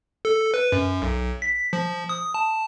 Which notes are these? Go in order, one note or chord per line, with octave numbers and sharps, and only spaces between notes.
A4
B4
F#2
B1
B6
F3
D#6
A5